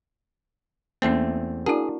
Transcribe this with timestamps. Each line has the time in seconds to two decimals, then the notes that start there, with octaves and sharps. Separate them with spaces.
1.02 E2 A3 A#3 C4 C#4
1.66 D4 E4 F#4 G#4 A#4 A5